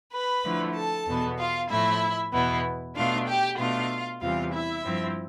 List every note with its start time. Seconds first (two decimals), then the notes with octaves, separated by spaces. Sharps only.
0.13 B4 B5
0.44 D3 F3 A3 E4
0.75 A4 A5
1.07 E2 B2 B3
1.39 F4 F5
1.70 A2 F3 A3 E4 E5
2.33 E2 B2 B3 E4
2.96 B2 A3 D4 F4 F5
3.27 G4 G5
3.58 B2 A3 D4 F4 F5
4.21 E2 C3 E3 G3 F4 F5
4.53 E4 E5
4.84 G2 F3 C4 E4